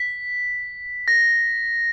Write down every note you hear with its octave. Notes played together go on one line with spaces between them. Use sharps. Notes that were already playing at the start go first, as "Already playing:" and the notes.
Already playing: B6
A#6